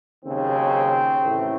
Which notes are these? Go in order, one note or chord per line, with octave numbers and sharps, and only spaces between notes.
D#2 C#3 F#3 C4
A1 A2 A3